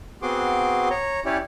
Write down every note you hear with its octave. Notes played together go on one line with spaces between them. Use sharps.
B3 C4 F#4 G#4 C6 D6
C#5 A#5
C#4 E4 G4 C#5 D5